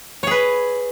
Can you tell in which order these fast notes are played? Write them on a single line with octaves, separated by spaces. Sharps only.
C#5 G#4 B4